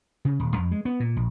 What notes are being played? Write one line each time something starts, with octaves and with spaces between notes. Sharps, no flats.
C#3
D#1
F2
G#3
B3
A#2
A#1